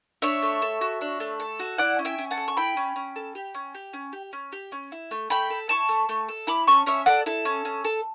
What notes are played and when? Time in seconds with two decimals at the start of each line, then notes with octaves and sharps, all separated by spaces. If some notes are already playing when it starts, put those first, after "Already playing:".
0.22 D4 C#5 E5
0.43 A3
0.62 A4
0.81 F#4
1.01 D4
1.20 A3
1.40 A4
1.59 F#4
1.78 E4 D5 F#5
1.99 C#4
2.05 E5 G5
2.18 C#4
2.31 F#5 A5
2.37 A4
2.48 C#6
2.57 E4 G5 B5
2.77 C#4
2.96 C#4
3.16 A4
3.35 G4
3.55 C#4
3.74 G4
3.93 C#4
4.13 G4
4.33 C#4
4.52 G4
4.72 C#4
4.92 E4
5.11 A3
5.30 A3 G5 B5
5.50 A4
5.69 E4 A5 C#6
5.89 A3
6.09 A3
6.28 A4
6.47 E4 B5 D6
6.67 C#4 A5 C#6
6.86 C#4 C#5 E5
7.06 A4 D5 F#5
7.26 E4 A4
7.45 C#4
7.65 C#4
7.85 A4